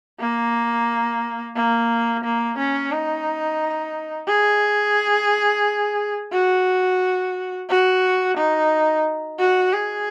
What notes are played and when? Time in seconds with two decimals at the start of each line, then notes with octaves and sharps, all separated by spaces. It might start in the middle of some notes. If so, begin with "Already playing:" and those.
0.19 A#3
1.56 A#3
2.24 A#3
2.58 C#4
2.92 D#4
4.28 G#4
6.32 F#4
7.69 F#4
8.37 D#4
9.39 F#4
9.73 G#4